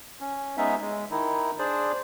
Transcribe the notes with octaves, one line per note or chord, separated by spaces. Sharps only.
C#4
G#3 B3 C#4 D#4 E5
G#3
D#3 D#4 E4
D4 G#4 C5 D5